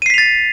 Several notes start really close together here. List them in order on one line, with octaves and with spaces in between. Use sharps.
D#7 C7 B6 F7 A6